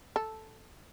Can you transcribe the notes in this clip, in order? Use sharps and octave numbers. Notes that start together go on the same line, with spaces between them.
A4